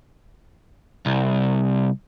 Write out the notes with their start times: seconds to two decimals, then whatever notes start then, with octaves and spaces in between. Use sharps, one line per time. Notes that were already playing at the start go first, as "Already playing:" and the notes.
1.06 C2